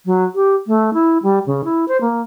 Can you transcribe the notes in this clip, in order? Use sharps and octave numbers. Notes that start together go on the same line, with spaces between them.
F#3
G4
A3
E4
G3
C#3
E4
C5
A#3